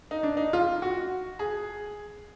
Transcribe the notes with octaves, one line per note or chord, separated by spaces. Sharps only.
D#4
D4
D#4
F4
F#4
G#4